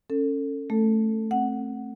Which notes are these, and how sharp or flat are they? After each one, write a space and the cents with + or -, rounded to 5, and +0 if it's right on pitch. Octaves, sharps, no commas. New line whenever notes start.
C#4 -10 A4 +25
A3 +0 A4 +15
C4 +15 F#5 +0